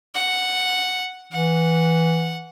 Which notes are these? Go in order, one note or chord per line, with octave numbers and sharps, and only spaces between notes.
F#5
E3 F#5